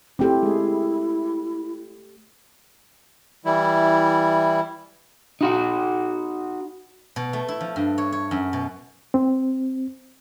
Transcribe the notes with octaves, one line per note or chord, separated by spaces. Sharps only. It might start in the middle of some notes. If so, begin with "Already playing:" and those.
A3 C4 E4 G4 A4 G5
G#3 G#4
E3 G3 E4
D#4 F#4 F#5
B2
A3
E4
F3
G2
C#5
C#5
F#2
B2
C4